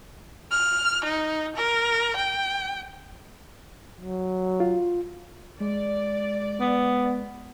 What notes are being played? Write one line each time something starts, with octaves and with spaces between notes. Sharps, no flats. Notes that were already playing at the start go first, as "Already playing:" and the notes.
F6
D#4
A#4
G5
F#3
F4
G#3 D5
B3